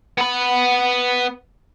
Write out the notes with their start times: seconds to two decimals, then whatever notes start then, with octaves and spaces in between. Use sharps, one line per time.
0.18 B3 B5